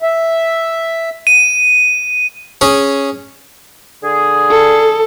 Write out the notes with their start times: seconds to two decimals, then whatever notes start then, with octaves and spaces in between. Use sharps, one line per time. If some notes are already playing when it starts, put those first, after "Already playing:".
0.02 E5
1.27 D#7
2.61 C#4 G#4
4.04 D3 G#4
4.51 A4